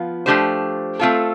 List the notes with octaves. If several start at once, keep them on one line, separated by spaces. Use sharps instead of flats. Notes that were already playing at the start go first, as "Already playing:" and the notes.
Already playing: F3 B3 F4
F3 A3 D4 G4 C5
A3 C4 F4 A4